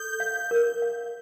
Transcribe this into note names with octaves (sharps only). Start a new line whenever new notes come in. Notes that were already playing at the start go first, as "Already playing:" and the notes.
Already playing: A4 G6
F5
A#4
F5